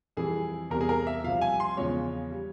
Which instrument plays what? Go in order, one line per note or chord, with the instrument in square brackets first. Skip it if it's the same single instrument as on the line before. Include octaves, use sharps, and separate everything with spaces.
[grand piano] F2 E3 G3 G#4
E2 C3 G3 A#4
G#4
A#4
E5
C2 C3 F3 F5
G#5
C6
E2 C#3 F3 G#3 C#5
G3